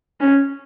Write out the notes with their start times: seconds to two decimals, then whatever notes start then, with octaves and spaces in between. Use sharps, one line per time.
0.21 C#4